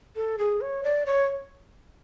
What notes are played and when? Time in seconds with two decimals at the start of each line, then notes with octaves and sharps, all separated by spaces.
0.16 A4
0.38 G#4
0.61 C#5
0.83 D5
1.06 C#5